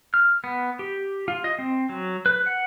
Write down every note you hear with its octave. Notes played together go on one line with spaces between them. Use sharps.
F6
B3
G4
F4
D#5
C4
F#3
B4
F#5